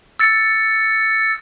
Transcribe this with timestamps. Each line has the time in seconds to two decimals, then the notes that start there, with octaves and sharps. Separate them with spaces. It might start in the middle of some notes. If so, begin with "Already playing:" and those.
0.20 E6 A6 C#7